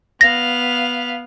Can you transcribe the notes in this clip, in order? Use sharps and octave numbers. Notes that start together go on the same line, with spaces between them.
B3 F5 A#6